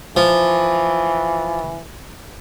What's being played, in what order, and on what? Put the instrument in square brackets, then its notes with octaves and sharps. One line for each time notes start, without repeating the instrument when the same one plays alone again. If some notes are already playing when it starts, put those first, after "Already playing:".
[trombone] E3 [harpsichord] F3